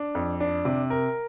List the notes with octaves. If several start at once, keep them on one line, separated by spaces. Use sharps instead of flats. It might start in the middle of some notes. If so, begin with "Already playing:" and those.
Already playing: D4
F2
D4
C3
A#4